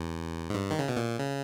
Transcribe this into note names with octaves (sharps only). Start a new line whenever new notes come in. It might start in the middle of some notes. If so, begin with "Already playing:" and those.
Already playing: E2
G#2
G2
D#3
C#3
B2
A#2
C#3